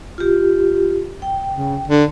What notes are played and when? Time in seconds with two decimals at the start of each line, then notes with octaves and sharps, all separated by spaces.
0.18 F4 G4
1.22 G5
1.52 C#3
1.87 D3